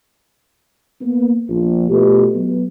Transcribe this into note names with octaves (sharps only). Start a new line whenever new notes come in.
A#3 B3
A#1
B2 A3 F4 G4
F#3 B3